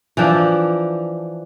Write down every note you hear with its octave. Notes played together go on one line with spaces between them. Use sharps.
E3 F3 D4